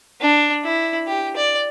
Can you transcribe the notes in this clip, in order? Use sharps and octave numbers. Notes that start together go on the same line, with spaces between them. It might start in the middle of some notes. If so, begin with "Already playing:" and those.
D4
E4
G4
D5